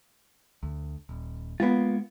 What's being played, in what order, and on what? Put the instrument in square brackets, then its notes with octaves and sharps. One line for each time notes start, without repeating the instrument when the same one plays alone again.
[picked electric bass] D2
D#1
[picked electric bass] G#3 A#3 [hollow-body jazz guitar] B3 F4